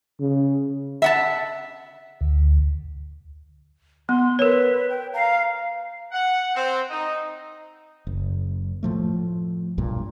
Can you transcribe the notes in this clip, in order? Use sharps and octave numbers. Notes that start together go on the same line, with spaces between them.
C#3
E5 F#5 A5
D2
B3 C6
A#4 B4 C#5
G5
F5 A#5
F#5
C4
D#4
F#1
A2 F3 A3
B1 G2 A#2